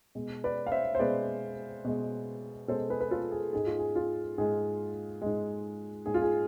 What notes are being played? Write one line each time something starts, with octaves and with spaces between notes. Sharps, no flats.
B2 G#3
B4 D5
F5
C5 E5
C5
B2 G#3 B4 D5
B2 G#3
B2 G#3 A4 C5
G#4 B4
B4
F4 A4
G#4
G#2 G#3 G#4
F4
G#4
F4
G#2 G#3 G#4
G#2 G#3
G#2 G#3 G#4
F4
G#4